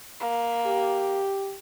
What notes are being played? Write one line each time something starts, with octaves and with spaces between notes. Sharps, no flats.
A#3
G4